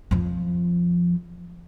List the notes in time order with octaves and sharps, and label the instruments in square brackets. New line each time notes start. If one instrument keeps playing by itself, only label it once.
[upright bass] F2 F3